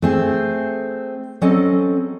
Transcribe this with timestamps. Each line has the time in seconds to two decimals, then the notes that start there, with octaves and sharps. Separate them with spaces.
0.02 A3 C4 G#4
1.41 F#3 C4 C#4 A4 D#5